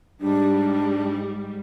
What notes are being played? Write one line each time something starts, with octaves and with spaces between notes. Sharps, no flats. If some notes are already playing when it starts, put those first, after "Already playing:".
G#2 G3 D4